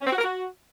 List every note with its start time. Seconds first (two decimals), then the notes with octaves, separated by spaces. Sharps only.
0.01 C#4
0.07 C4
0.13 F#4
0.18 A#4
0.24 F#4